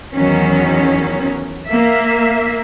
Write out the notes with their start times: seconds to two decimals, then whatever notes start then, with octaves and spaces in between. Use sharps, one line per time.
0.15 E2 D#3 F#3 C#4
1.68 A#3 E5